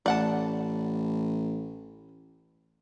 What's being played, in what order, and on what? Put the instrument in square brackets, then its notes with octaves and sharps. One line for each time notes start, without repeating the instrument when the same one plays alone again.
[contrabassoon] A1 [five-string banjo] D5 F#5 A5